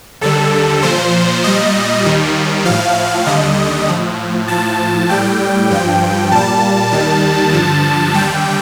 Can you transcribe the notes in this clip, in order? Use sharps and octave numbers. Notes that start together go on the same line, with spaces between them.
D#2 D3 G3 A4
A#2 F3 C5
A#2 G3 D#5
D#2 D#3 G3
A2 F3 F5
D#2 D3 G3 D#5
A2 F3
A2 F3 A5
A2 G3 G5
G2 F3
A#2 G3 A5
D#2 D#3 G3
G2 D3 F3
D#2 D3 G3 G5